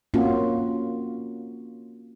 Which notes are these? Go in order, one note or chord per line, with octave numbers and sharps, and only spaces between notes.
A#3 C4 C#4 F4 F#4